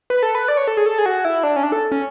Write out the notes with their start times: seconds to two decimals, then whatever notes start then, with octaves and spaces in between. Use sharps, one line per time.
0.10 B4
0.23 A4
0.35 B4
0.48 D5
0.57 C#5
0.68 A4
0.77 G#4
0.86 A4
0.98 G#4
1.06 F#4
1.25 E4
1.43 D4
1.56 C#4
1.63 D4
1.72 A4
1.92 C#4